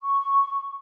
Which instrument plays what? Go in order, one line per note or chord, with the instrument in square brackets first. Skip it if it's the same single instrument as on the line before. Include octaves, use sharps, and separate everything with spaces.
[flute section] C#6